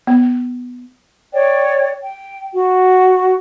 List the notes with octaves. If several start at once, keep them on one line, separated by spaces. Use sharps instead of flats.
B3
C#5 D5 G5
G5
F#4